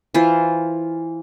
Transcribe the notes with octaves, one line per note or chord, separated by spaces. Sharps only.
E3 F4 C5